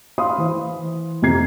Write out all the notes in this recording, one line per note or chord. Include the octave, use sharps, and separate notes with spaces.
F5 B5 C6 D#6
E3 C5
F2 C3 A#5 G#6 C7